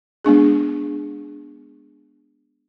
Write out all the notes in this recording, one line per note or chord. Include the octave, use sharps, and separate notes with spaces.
G#3 B3 D4 G#4